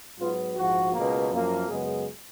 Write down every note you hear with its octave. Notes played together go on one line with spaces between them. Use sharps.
G#2 F#3 B3 F4
A#1 G#2 F3 F#4
C#2 B2 A#3
F#2 F3 A#3
F#2 C#3 G#3 B3 G#4